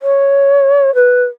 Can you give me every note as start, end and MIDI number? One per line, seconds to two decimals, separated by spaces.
0.02 0.94 73
0.95 1.23 71